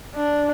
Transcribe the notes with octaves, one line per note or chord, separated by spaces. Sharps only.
D4